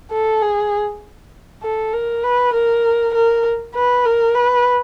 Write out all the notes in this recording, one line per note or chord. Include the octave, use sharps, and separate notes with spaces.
A4
G#4
A4
A#4
B4
A#4
A#4
B4
A#4
B4